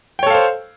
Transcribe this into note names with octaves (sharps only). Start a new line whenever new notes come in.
A4 C5 C#5 F5 G5